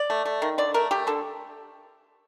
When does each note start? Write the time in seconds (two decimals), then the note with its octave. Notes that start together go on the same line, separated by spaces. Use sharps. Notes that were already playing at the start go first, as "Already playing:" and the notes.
Already playing: D5
0.10 A3
0.25 A3
0.42 D#3
0.58 D3 D5
0.74 A3 A#4
0.91 A3 G4
1.07 D3 A4